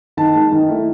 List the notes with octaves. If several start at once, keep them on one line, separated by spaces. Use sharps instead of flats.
D#3 A5
G#3 D#4
D#3
A3 E4